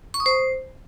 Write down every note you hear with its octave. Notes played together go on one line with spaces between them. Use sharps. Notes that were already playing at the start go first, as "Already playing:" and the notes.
C#6
D#6
C5